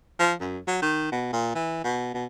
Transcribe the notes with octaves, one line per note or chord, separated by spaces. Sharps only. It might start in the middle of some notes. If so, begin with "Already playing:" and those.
F3
F#2
F#3
D#3
B2
A#2
E3
B2
B2